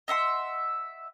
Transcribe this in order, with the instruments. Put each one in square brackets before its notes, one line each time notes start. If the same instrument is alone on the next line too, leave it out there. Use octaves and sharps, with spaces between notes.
[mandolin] D#5 E5 F#5 C6